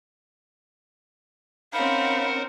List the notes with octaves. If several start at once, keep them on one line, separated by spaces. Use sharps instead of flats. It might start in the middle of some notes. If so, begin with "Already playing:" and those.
C4 C#4 D#4 A#4 C5 F5 F#5 B5